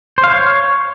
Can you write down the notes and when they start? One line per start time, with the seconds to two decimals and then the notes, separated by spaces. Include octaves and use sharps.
0.18 C5
0.24 F5
0.29 C#5